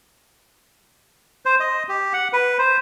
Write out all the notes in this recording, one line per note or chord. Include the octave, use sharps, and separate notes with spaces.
C5
D#5
G4
F#5
B4
C5